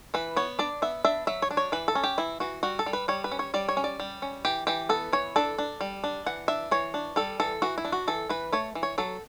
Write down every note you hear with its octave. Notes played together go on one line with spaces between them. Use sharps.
E3 B4
B3 C#5
D4 D5
B3 E5
D4 E5
F#3 E5
C#5
D4
C#5
E3 B4
A4
C#4
G4
E3 E4
E3 F#4
G3 F#4
A4
G3
B4
G3 C#5
B4
C#4
C#5
G3 D5
C#5
C#4
D5
G3
C#4
E3 G4
E3 G4
B3 A4
E3 C#5
D4 A4
D4
G3
D4
E3 F#5
D4 E5
E3 C#5
D4
G3 A4
E3 A4
E3 F#4
E4
D4
F#4
E3 A4
E3 B4
A3 C#5
E3
C#5
F#3 A4